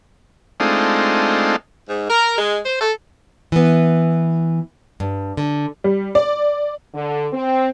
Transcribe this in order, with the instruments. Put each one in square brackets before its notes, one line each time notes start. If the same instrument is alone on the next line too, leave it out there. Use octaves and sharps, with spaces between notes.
[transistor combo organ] G#3 A3 C4 D4 D#4 F4
[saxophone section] G#2
A#4
G#3
C5
A4
[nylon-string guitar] E3 B3
G2
D3
[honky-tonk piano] G3
D5
[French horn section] D3
C4